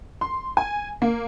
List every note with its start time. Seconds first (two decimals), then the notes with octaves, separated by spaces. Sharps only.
0.21 C6
0.57 G#5
1.02 A#3